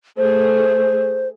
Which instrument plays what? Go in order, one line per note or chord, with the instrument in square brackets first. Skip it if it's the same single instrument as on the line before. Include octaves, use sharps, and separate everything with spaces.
[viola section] A3 G#4 [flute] C5